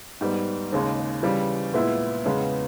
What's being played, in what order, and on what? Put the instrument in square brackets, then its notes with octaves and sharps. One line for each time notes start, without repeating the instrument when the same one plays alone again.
[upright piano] G#2 G3 B3
D#2 C#3 G#3
C#3 E3 G3
A#2 G#3 B3 E4
E2 C#3 G#3 B3